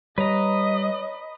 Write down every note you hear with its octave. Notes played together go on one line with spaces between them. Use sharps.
G3 B4 C#5 D#5 A#5